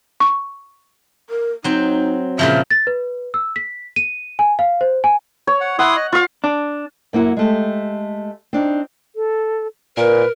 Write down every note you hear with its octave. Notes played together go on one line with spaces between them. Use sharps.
C#6
A#4
F#3 C4 D#4
A#2 C#3 F3 E5
A6
B4
E6
B6
D#7
G#5
F5
C5
G#5
C#5
F#5
E4 F#5 C6 D#6
D#5
F4 F5 C#6
D4
F#2 A#3 E4 F#5
G#3 A3 G4
C4 D4 D#4
A4
A#2 A#4 B4